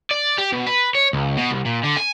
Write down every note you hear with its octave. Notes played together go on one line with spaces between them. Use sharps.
D5
G4
B2
B4
C#5
C#2
B2
C2
A#2
D3
G#5